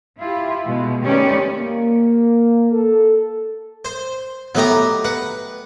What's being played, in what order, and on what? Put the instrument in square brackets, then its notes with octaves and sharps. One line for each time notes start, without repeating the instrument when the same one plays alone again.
[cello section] E4 F4 G4
B2 G#3
D#3 A3 C#4 G4 B4 D5
[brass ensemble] A#3
A4
[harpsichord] C5
[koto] F#3 A3 A#5 [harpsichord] B3 D#4 G4
[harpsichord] B4 [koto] F#5